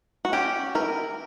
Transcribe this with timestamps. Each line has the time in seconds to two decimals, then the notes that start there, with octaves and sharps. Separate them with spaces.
0.25 F#4
0.33 C#4 G4
0.75 E3 A#4